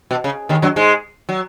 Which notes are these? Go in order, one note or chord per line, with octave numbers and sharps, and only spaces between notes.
B2
C#3
D#2 D#3
F#2 F#3
G#2 G#3
F#3